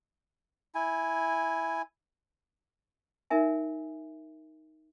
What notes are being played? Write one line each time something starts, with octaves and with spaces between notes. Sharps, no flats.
E4 G#5
D#4 A#4 E5 G#5